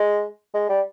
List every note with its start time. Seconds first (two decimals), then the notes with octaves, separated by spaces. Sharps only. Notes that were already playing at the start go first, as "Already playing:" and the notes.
Already playing: G#3
0.54 G#3
0.69 G3